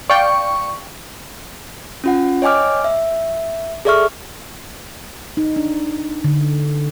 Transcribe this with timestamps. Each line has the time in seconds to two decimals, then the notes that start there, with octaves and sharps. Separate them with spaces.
0.10 D5 F5 G5 C#6
2.04 C#4 F4 F#5
2.42 C#5 D#5 G5 G#5 D6 F6
2.84 E5
3.85 G#4 A4 D5 E5 C#6 F6
5.37 D#4
5.56 D4
6.24 D3